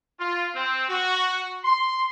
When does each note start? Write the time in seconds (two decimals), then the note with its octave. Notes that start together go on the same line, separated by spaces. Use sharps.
0.19 F4
0.55 C4
0.89 F#4
1.64 C6